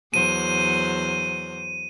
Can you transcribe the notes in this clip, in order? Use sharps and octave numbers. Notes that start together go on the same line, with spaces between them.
E2 F#3 C5 D#7